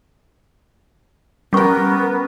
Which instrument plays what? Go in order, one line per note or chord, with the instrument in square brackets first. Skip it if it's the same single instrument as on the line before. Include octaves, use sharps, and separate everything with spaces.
[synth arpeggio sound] G3 G4 [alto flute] B3 [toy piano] C#4 C#6 [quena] A#4